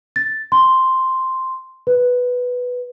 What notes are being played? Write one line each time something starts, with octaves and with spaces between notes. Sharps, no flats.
A6
C6
B4